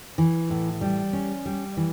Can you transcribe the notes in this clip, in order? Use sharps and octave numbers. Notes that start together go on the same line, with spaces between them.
E3
A2
G3
C#4
G3
E3